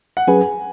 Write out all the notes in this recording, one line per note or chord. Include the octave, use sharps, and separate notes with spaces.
F#5
F#3 C#4 G#4 B4 G#5